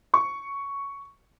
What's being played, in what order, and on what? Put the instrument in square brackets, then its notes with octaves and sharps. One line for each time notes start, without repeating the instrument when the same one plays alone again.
[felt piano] C#6